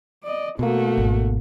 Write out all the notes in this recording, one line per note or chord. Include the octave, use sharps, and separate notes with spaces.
D5 D#5
B2 A3 A#3 F#4
G#1 D2